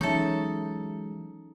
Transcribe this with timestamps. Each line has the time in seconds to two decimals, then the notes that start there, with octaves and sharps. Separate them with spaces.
0.01 E3 F#3 G#3 C#4 D#4 A4 C#5 E5